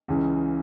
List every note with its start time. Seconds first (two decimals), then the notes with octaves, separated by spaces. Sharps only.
0.08 C#2 C#3 E3